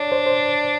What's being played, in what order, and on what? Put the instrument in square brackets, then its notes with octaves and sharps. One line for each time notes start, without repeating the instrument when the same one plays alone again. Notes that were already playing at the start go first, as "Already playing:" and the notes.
Already playing: [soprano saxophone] D4 [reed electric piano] C#5 D5
[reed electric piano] C5
C5